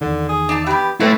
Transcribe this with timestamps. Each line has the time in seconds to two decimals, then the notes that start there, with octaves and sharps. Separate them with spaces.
0.01 E2 D3 D#3
0.29 G#4
0.49 D4 D#4 A5
0.66 E3 B3 G4
1.00 F#3 A3 C4 E4 A4 B4